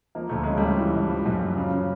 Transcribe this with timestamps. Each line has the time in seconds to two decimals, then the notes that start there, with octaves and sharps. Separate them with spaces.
0.15 F3 A#3
0.29 D2 A3
0.44 C#3 G#3
0.57 G2 G3 A3
0.79 E3
0.94 G2
1.09 F3
1.26 F#2
1.42 F#2
1.57 C#3
1.73 C#3